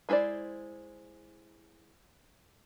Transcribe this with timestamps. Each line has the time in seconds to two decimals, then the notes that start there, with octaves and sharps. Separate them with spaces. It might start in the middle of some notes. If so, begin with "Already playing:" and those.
0.09 G#3 E4 B4 C5 D5